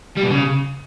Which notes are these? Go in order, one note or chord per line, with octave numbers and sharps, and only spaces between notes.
G3
B2
C#3